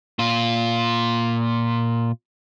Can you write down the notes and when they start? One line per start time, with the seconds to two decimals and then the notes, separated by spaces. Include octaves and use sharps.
0.19 A#2 F4